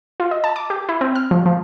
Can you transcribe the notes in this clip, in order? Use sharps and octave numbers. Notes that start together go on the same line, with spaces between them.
F4
D#5
A5
D6
G4
E4
C4
F6
F3
F3